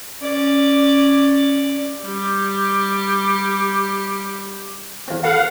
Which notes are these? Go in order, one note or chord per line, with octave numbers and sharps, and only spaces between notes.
C#4 D5
G3 G4
E2 C4
A4 B4 F5 F#5 A5